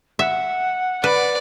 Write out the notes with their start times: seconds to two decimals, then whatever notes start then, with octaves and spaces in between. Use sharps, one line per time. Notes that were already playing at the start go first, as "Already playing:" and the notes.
0.19 E5 F#5
1.04 B4 D5